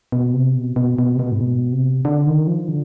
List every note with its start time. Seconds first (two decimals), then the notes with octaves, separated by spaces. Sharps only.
0.12 B2
0.33 C3
0.55 B2
0.76 B2
0.99 B2
1.15 C3
1.19 B2
1.32 G#2
1.41 B2
1.72 C3
2.05 D3
2.27 D#3
2.47 F3
2.68 D3